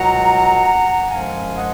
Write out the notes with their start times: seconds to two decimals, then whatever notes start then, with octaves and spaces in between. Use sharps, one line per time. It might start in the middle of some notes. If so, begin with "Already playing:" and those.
Already playing: C#2 B2 F#3 F#5 A#5
1.10 F#2 F3 G#3 F5 G#5
1.55 D#5 F#5